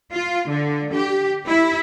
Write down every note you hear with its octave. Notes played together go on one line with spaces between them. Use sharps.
F4
D3
G4
E4